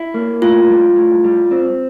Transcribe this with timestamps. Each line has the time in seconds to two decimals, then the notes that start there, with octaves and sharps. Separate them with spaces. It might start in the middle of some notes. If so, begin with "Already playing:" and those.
Already playing: E4
0.14 A#3
0.42 A2 F4
0.69 G3
0.96 A2
1.24 G3
1.51 C4